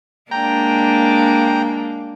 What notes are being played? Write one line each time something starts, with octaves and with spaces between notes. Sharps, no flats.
G#3 A#3 D4 G5 A#5